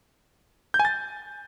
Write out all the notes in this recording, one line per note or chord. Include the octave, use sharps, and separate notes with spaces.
G6
G#5
A6